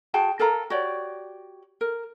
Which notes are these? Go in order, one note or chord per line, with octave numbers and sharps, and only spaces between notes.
F#4 G#4 G5 A5
A4 A#4 F5 A#5
F#4 G4 C#5 D5
A#4